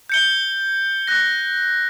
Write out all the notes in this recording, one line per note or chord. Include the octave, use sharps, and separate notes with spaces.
G6 C#7 G7
F#6 A#6